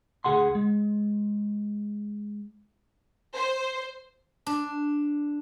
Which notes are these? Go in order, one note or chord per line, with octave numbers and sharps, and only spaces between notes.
D2 G#4 F#5 C6
G#3
C5
D4